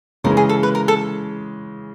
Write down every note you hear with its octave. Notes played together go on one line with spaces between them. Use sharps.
C#3 E3 G#3 A#4
G#4
A4
B4
A#4
A4